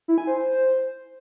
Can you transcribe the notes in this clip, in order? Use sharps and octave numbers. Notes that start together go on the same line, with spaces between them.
E4
G#5
C5